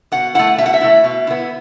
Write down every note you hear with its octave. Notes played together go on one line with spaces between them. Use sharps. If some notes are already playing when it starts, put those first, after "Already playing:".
B2 F#5
A3 E4 F#5
B2 E5
F#5
E5
A3 E4
B2
B3 E4